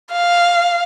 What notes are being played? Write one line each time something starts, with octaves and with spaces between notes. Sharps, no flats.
F5